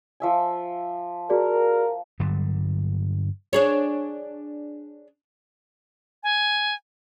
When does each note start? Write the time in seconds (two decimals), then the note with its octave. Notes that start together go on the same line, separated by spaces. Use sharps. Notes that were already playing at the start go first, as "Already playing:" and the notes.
0.20 F3 E5 G#5
1.30 F#4 G#4 A#4 D5
2.20 G2 D3 F#3 G3
3.53 D4 G#4 C#5
6.23 G#5